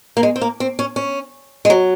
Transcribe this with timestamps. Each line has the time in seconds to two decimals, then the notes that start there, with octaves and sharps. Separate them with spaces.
0.17 A#3
0.23 G#3
0.36 C4
0.42 A#3
0.60 C4
0.79 C#4
0.96 C#4
1.65 G#3
1.70 F#3